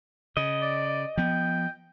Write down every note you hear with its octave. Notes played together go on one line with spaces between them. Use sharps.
C#3 D#5
D5
F3 B3 G5